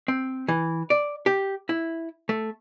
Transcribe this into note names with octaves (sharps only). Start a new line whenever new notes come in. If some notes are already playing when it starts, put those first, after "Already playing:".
C4
E3
D5
G4
E4
A3